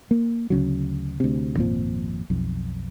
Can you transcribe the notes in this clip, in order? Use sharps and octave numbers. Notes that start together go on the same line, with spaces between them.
A#3
D2 C#3 F#3
D2 C3
G#1 F2 A#2 F3
B1 F2